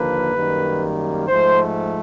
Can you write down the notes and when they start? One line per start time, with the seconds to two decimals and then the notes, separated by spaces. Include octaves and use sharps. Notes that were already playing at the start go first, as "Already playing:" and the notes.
Already playing: D#2 D3 F3 A#3 B4
0.35 F#2 D#3 G3 A#3
1.28 G#2 F3 A3 C5